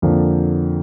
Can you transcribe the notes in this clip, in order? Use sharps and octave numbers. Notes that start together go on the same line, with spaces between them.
F2 D3 F3 A#3 D4